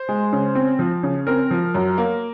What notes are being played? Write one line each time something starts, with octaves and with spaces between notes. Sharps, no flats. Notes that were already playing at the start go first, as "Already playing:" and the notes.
Already playing: C5
G#3
C#3
C4
F3
C#3
C4 A#4
F3
F#2
A#3